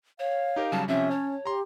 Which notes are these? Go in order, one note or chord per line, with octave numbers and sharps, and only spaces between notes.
C#5 F5
D#4 G4 A#4
C#3 F#3 G3 A5
C3 F3 C#4 E5
C#5 A5
G4 A#5 C6